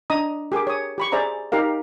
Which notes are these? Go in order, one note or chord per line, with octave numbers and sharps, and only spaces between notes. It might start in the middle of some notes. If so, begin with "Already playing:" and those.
D4 D#5 A#5 D#6
G4 G#4 A#4 D6
C#5 D#6
G4 B5 C#6
G#4 C5 D5 E5 A#5
D#4 G4 A#4 F5